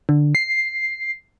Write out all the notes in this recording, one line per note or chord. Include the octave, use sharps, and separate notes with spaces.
D3
C7